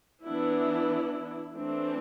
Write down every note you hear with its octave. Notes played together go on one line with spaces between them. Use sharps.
E3 B3 D4 E4
E3 A3 C4 D4